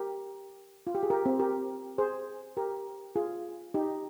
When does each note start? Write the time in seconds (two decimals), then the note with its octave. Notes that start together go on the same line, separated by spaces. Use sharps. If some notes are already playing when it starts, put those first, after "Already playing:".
Already playing: G4 A#4
0.87 F4
0.95 G4
1.03 G#4
1.10 G4 A#4
1.26 C4
1.40 G4 A#4
1.98 G#4 C5
2.57 G4 A#4
3.16 F4 G#4
3.74 D#4 G4